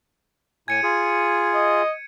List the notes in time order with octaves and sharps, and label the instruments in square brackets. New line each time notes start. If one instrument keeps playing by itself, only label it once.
[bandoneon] A2 G#5 [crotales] G#6 C#7 D#7
[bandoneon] F4 G#4
[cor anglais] D#5